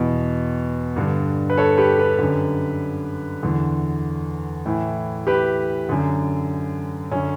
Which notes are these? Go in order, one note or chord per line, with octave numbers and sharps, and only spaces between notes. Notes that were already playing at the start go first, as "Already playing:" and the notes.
Already playing: E2 B2
G2 D3
B4
A4 C#5
G4 B4
G4 B4
F#2 D3
E2 D3
A2 E3
G4 B4
F#2 D3
F#2 D3 C#4